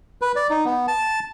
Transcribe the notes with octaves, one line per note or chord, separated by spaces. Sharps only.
B4
D5
D#4
B3
A5